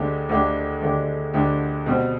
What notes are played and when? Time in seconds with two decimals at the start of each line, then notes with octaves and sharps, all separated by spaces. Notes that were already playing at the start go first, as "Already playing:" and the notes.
Already playing: D2 D3 G#3 D4 G4
0.29 D2 D3 G#3 D4 G4
0.82 D2 D3 G#3 D4 G4
1.33 D2 D3 G#3 D4 G4
1.86 B2 G3 C4